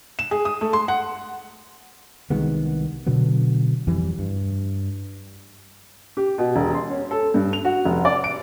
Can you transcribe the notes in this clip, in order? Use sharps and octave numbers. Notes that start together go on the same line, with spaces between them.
E7
G#4
D#6
A3
C6
F#5
C2 D#3 G#3 B3
B2 D3 F#3 B3
F2 E3 G3
G2
G4
B2
E1
C6
C#4
A4
G2
F7
F#4
F1
D5
D7